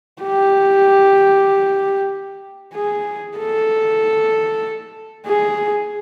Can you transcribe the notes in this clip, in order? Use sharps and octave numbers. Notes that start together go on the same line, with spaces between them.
G4
G#4
A4
G#4